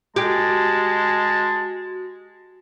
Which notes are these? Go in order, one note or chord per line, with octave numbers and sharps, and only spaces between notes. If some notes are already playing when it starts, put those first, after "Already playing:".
G#3 F#4 G4 A5